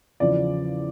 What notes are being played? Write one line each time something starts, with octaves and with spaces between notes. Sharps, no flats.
E2 C#3 F3 D5